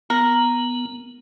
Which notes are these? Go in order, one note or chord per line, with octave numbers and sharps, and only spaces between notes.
B3 A#4